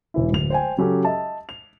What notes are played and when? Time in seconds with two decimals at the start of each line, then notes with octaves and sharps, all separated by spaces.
0.14 E1 E3 E4
0.32 D1 F7
0.50 C5 G5 G#5
0.77 C#3 F#3 C#4 G4 A4
1.05 D#5 E5 A5
1.49 F7